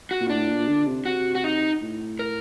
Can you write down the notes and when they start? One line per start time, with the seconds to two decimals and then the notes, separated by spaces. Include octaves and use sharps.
0.11 F#4
0.20 A#2
0.30 A2 D4
0.49 A#2
0.68 D3
0.87 C3
1.06 C3 F#4
1.35 F#4
1.44 D#4
1.82 A2
2.19 A#4